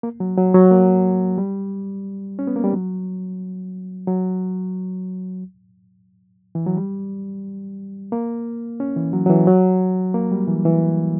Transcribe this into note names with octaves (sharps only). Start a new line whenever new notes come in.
A#3
F#3
F#3
F#3
A#3
G3
C#4
B3
A#3
G3
F#3
F#3
E3
F#3
G3
A#3
C#4
E3
F#3
F#3
E3
F#3
A#3
G3
E3
E3